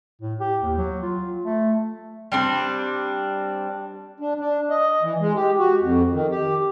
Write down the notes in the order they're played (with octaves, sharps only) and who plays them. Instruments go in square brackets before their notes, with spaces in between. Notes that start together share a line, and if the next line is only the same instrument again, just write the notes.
[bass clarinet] A2
G4
D#2
F#3
F4
A3
[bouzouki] G3 C4 D4
[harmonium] D4
D4
D#5
E3
G#3
G4
F#4
F2
D#3
G4